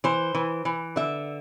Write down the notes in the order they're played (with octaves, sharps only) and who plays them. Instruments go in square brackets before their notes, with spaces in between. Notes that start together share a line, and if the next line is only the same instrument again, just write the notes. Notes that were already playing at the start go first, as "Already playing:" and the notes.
[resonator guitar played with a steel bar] E3 C5
E3
E3
D3 E5